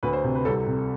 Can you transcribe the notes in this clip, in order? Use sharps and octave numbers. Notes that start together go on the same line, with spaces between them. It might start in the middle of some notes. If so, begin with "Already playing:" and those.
D2 B4
C5
C3
B4
C2 A4
C3